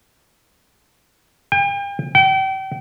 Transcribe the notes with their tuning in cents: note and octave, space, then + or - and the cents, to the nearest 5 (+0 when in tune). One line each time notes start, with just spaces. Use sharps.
G5 +40
G5 -35